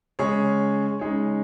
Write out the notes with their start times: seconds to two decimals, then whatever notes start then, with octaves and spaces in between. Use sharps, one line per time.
0.19 C#3 G#3 C#4 G#4 C#5
0.99 C#3 G#3 D#4 G#4 C#5